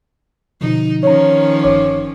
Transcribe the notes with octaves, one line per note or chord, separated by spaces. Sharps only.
B2 D3 F3 D#4
D#3 F3 C#4 C#5 A#5
G1 C#5 D6